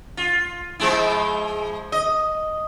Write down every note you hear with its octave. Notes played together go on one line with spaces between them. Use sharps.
F4
F3 G#3 E4
D#5